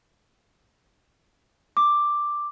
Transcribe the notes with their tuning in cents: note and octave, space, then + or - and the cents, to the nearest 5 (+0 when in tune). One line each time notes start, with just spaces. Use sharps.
D6 +5